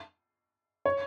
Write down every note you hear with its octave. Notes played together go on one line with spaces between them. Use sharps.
C#5